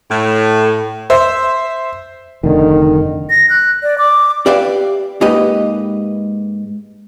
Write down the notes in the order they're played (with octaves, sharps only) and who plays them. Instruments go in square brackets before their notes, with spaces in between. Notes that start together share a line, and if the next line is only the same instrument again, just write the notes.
[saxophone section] A2
[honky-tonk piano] C5 E5
[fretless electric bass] F1 D3 [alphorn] D#3
[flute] A#6
F#6
D5
D6
[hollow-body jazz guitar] G4 B4 D5 E5 F5 G5
G#2 A#3 G4 B4 D#5